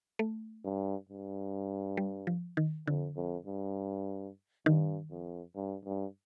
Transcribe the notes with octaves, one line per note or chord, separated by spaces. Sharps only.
A3
G2
G2
G3
F3
D#3
F2 D3
F2
G2
G2 D#3
F2
G2
G2